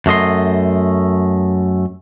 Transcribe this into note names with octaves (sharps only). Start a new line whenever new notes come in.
F#2 A3 D#5 C6